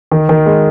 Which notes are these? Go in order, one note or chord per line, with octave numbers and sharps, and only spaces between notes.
D#3
D#3
G#3